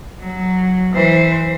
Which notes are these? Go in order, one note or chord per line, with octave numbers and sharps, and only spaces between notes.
F#3
E3 C5